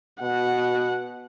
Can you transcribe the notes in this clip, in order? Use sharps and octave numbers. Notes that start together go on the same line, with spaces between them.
B2 F#5